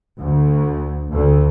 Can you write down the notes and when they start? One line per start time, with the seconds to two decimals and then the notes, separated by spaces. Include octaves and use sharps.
0.18 D2
1.10 D2